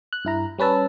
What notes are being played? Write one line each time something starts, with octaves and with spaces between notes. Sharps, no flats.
F#6
G2 E4 A#5
G3 C#4 B4 A5 E6